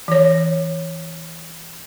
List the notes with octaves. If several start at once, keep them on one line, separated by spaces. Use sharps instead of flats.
E3 C#5